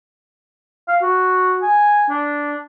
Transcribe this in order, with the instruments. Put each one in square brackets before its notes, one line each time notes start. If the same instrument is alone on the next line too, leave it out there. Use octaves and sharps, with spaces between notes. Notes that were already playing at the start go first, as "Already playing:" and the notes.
[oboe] F5
F#4
G#5
D4